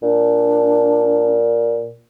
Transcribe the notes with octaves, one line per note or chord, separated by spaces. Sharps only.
A#2 D4